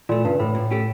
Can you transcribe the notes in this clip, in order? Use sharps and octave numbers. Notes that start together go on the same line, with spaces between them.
A#2 E3 A3
G2 C#3
A2 E3 A3
A#2
A3 C#4 G4